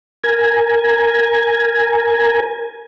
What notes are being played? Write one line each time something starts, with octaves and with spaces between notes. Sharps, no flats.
A#4 G#5